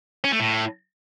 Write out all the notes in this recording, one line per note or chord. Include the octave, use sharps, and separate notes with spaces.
C#4
A3
A2